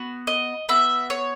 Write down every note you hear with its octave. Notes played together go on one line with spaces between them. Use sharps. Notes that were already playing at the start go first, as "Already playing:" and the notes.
Already playing: B3 F#4
D#5
B3 F#4 E5
C#5